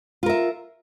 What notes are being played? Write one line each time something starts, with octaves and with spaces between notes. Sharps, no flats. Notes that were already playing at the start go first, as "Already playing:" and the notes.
F4 A#4 E5